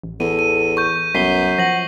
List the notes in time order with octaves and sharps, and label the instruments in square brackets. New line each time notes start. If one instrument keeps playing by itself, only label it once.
[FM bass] A1
[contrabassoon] E2 [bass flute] A4 [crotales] D#7
[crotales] D#7
C#6 G6
[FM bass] C2 [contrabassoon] F#2 [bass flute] B3 [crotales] B6 C7 G7
[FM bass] F3 [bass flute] F#5 [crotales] A#6 F#7